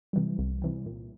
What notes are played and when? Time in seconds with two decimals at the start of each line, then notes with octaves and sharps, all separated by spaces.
0.13 C3 E3 G3
0.38 C2
0.62 C3 E3 G3
0.86 A#2